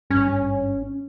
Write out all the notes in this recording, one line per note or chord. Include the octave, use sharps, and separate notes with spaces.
G#1 G2 C#4